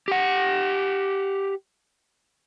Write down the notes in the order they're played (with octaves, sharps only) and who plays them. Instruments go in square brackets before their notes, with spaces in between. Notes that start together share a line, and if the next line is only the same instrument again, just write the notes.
[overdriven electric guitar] G4 F#5